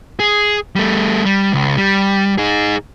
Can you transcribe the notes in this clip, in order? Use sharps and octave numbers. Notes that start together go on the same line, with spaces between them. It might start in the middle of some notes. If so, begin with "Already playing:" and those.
G#4
G3 A3
G3
C#2
G3
D#4 G#4